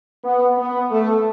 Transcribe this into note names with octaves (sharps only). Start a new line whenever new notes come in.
B3
B3
A3